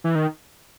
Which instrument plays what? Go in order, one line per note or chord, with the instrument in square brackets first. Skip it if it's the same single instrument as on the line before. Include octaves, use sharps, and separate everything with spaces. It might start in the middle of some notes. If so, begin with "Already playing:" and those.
[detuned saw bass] E3
D#3